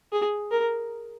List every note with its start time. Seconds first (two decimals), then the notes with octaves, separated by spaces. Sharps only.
0.12 G#4
0.51 A#4